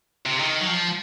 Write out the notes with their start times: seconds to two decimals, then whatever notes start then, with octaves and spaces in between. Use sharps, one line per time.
0.26 C3
0.40 D#3
0.61 F#3
0.67 F3